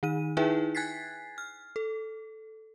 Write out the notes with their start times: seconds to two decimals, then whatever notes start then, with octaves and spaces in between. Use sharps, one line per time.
0.03 D#3 D#4 D#7
0.37 D#4 E4 G#4 B4 E5 G5
0.75 G#5 F#6 G#6 A6 B6 C7
1.38 F6
1.76 A4